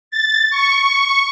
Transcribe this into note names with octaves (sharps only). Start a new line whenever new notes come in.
A6
C#6